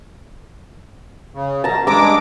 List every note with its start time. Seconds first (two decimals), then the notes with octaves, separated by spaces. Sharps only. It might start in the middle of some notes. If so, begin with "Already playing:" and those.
1.34 C#3
1.64 F#2 B2 A5 A#5
1.87 G2 G#3 A#5 D6 E6